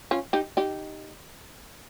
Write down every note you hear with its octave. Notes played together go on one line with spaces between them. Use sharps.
C#4 F4
D#4 G4
D#4 G4